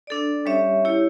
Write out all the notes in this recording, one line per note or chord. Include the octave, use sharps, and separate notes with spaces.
D4 A4 D5
G3 C#4 G4 C#5 E5
E4 G4 C#5